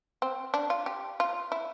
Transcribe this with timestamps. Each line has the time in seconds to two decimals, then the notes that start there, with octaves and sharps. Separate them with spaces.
0.22 C4
0.54 D4
0.70 F4
0.86 G4
1.20 F4
1.52 E4